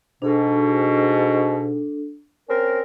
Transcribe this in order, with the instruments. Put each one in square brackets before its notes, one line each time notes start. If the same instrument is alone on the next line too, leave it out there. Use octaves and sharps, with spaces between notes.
[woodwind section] G#2 B2 [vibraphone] D4 A4
[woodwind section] C4 C#4 A#4